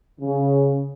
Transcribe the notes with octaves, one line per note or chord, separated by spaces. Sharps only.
C#3